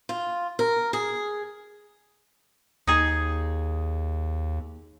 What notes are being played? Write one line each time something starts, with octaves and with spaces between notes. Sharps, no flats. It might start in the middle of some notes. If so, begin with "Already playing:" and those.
F4
A#4
G#4
D#2 D#4 G#4